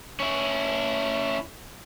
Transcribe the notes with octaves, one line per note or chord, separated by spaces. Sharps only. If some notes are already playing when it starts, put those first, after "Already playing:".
C#4 E4